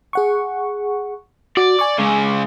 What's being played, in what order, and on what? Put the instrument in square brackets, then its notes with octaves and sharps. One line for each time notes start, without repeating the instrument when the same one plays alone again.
[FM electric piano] G#4 F#5 C#6
[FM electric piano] F#4 [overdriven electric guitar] D5
[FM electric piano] G#5 C#6 D6
[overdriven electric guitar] C#3 G#3